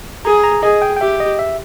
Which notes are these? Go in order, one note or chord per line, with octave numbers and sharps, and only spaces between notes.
G#4 A#5
A#5
G#4 D#5
G5
G5
G4 E5
D#5
E5